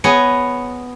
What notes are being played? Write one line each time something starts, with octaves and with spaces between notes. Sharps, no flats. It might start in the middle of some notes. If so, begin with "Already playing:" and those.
B3 G#4 C#5 D#5